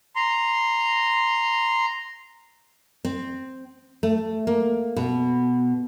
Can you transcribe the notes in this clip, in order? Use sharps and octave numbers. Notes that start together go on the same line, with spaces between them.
A#5 C6
C4
A3
A#3
B2